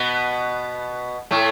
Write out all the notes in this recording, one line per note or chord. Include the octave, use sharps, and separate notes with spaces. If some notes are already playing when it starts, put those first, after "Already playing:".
Already playing: B2 B3
A2 A3